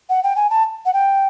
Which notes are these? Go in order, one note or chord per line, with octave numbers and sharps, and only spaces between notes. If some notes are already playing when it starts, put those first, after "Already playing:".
F#5
G5
G#5
A5
F#5
G5